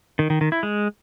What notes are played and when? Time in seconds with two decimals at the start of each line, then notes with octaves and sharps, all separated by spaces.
0.19 D#3
0.30 D#3
0.41 D#3
0.52 E4
0.63 G#3